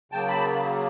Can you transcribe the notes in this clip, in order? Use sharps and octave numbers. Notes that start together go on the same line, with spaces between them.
C#3 F#3 A#3 G5 A5
A5 B5